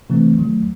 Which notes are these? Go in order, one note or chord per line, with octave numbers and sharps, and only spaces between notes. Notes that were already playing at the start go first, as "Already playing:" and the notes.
C3 E3 A3 C4
D#3 F#3 A3